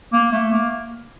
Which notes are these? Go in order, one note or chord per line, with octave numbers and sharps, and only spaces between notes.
A#3
A3
A#3